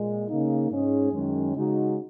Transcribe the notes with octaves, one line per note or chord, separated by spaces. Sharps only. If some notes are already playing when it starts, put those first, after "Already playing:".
Already playing: A#2 G#3
C#3 A#3 D#4
G#2 G#3 C#4 G#4
F#2 D#3 G#3 C#4
C#3 G#3 D#4 F#4